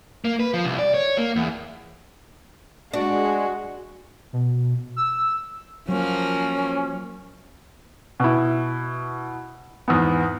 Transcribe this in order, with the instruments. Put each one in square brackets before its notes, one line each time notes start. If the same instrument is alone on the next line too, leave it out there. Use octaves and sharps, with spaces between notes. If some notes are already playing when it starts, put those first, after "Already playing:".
[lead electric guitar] A#3
B4
F3
C2
D5
C#5
A#3
E2
[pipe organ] G#3 [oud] D4 [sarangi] F#4
[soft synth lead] B2
E6
[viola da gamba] F3 A#3 [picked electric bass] F#3 [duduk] C#4
[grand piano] B2 E4
E2 G#2 B3